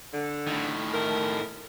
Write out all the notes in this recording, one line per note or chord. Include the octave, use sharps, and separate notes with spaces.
D3
A2 D#3
A3 A#4